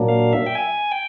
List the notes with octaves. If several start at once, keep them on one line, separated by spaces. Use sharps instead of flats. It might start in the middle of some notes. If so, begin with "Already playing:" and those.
Already playing: A#2 F#3 A#3 D4
F5
E5
G5
G#5
G5